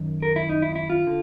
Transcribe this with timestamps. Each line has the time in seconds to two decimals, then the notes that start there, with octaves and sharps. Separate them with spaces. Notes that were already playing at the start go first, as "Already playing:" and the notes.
Already playing: F#2 D#3
0.22 A#4
0.36 E4
0.49 D#4
0.62 E4
0.75 E4
0.90 F4
1.07 D3